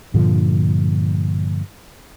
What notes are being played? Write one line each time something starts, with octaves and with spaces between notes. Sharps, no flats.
G2 A#2 D3 F3